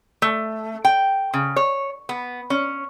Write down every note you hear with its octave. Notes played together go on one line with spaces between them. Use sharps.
A3
G5
C#3
C#5
B3
C#4